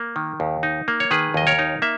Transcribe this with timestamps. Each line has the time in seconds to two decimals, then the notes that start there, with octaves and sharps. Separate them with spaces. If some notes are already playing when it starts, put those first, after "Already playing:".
Already playing: A#3
0.16 D#3
0.40 D#2
0.63 D#4
0.88 A#3
1.00 C#5
1.11 D#3 G#4 B4
1.34 D#2 D#5
1.47 A#4 C#5
1.59 D#4
1.82 A#3 E5